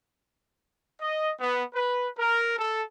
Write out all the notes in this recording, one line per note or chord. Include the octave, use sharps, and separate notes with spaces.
D#5
B3
B4
A#4
A4